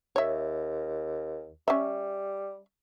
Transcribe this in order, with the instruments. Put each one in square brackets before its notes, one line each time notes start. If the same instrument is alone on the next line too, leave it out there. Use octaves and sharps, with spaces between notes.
[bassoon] D#2 [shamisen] C#5 E5
[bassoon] G3 [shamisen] C#4 E5